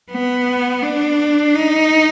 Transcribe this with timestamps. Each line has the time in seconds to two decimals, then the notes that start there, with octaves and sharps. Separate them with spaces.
0.11 B3
0.83 D4
1.55 D#4